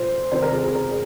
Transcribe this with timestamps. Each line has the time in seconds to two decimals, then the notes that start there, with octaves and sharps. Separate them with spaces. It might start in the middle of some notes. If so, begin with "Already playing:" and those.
Already playing: A#2 F3 C5
0.32 C3 D#3 C5
0.42 A#4
0.53 G#4
0.64 G#4
0.74 A#4
0.89 G#4